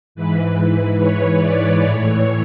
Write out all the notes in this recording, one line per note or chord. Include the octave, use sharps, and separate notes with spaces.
G#2 E3 B4
B4
C#5
D5
A2 E3 C#5